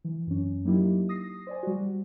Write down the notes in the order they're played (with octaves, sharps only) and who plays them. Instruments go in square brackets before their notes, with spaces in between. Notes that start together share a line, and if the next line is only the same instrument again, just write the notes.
[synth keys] E3
F#2 C#4
F#3 A#3 D#4 E4 G4
D#6 A#6 C7
C5 D5 G#5
G3 F#4